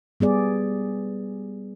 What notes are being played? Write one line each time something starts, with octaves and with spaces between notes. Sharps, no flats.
G3 B3 G#4 D5